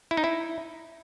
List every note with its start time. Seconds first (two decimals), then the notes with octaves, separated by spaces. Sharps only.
0.11 E4
0.17 D#4
0.24 E4